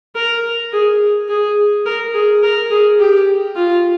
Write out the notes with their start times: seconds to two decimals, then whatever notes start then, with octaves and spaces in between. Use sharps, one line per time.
0.15 A#4
0.72 G#4
1.28 G#4
1.86 A#4
2.14 G#4
2.43 A#4
2.71 G#4
2.99 G4
3.55 F4